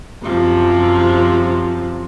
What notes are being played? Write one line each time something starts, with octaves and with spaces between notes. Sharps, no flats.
F#2 C3 F3